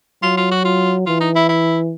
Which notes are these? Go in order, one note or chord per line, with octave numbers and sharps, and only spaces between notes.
F#3 F4
F4
F#4
F4
E3 F4
D#4
E4
E4